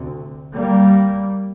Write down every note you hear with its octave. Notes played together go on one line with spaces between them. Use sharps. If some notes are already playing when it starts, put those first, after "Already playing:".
Already playing: D2 C3
G3 A#3